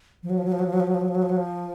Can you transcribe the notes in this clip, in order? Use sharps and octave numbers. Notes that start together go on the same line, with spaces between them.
F3
F#3
F3
F#3
F3
F#3
F3
F#3
F3
F#3
F3
F#3
F3
F#3
F3
F#3
F3